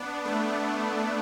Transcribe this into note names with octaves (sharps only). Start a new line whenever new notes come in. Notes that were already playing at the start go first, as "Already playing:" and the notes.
Already playing: B3 D4
A3